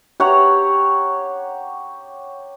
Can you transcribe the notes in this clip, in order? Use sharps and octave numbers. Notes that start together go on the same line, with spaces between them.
G4 C#5 F#5 A#5